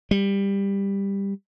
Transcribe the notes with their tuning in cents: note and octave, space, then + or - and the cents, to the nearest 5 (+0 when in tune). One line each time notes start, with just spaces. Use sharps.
G3 +15